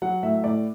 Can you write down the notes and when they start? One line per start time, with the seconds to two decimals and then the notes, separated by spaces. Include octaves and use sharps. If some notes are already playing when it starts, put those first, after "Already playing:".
0.02 F#3 F#5
0.23 A2 E5
0.44 A2 D5